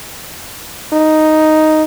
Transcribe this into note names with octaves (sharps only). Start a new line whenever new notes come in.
D#4